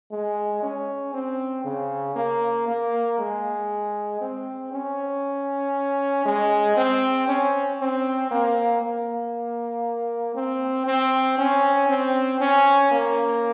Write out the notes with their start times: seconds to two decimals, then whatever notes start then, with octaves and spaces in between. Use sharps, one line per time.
0.12 G#3
0.63 C#4
1.14 C4
1.65 C#3
2.16 A#3
2.68 A#3
3.19 G#3
4.21 C4
4.72 C#4
6.26 G#3
6.77 C4
7.28 C#4
7.80 C4
8.31 A#3
8.82 A#3
10.36 C4
10.87 C4
11.38 C#4
11.89 C4
12.41 C#4
12.92 A#3